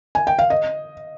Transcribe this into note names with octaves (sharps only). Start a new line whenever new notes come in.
G#5
G5
F5
D#5